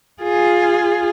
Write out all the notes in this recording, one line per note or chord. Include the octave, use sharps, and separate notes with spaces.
F4 G#4